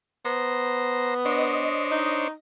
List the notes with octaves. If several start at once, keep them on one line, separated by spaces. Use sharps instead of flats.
B3 C5 A#5
D4 C5 C#5 D#5
D#4